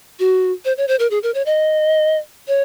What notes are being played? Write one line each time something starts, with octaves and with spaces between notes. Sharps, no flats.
F#4
C5
C#5
C5
A#4
G#4
A#4
C#5
D#5
C#5